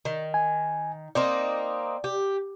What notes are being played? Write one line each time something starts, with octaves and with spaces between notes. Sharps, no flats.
D#3
G#5
A#3 C4 D#4 D5
G4